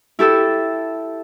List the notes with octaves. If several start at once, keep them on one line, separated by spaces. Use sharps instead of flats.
E4 G4 A4 E6